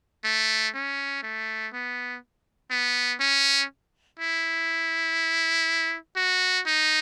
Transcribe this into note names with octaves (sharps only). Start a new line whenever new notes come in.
A3
C#4
A3
B3
B3
C#4
E4
F#4
D#4